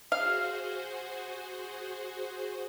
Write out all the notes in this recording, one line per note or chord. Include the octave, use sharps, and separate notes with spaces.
F#4 G#4 C5 F5